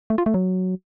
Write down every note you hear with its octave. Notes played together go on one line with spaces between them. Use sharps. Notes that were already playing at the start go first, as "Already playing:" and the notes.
A3
F4
A3
F#3